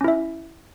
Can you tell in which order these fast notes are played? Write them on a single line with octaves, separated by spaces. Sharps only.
C#4 E4 E5